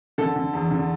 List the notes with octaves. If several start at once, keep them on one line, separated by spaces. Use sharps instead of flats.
D3 A4
D3
E2
D3